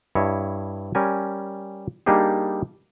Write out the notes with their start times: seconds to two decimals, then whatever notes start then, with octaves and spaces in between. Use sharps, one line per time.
0.15 G2 E4 C#5 D#5
0.95 G3 C#4 A#4 G#5
2.06 G3 A#3 D4 D#4 G4 G#4